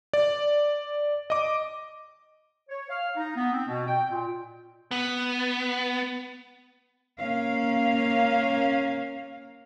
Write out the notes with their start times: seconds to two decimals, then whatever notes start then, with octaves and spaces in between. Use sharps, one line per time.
0.13 D5
1.30 D#5 D6
2.69 C#5
2.90 F5
3.17 D#4
3.36 B3
3.53 C4
3.67 B2
3.87 G5
4.10 A#2
4.91 B3
7.18 A#3 C#4 F5